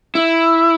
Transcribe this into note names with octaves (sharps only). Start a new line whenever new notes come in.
E4